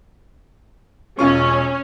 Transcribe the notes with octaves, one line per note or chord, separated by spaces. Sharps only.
E1 C#4 F4 C#6